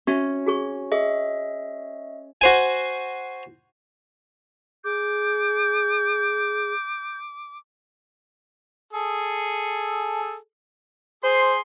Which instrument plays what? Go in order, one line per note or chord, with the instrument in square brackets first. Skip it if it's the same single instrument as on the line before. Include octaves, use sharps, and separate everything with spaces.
[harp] C#4 [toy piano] F#4 E5 C#6
[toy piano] F#4 G#4 C#6
[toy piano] G#4 [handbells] D#5 E5
[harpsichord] F#4 C5 G#5
[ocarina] G#4 [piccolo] D6 [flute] G6
[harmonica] G#4 A4
[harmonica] G#4 C6 [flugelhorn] C5